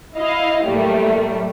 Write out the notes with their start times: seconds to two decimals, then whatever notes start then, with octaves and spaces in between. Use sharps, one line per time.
0.16 E4 D#5 F5
0.64 A2 F#3 G3 A3 A#3